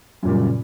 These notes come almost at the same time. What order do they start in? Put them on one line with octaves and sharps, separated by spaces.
F#2 A#2 G3 C#3